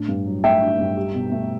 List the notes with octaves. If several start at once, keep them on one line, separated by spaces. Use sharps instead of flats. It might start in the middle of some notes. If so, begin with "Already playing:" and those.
Already playing: A2 D4
G2
F#3
A3 E5 G5
D4
G2
G4
B2
A3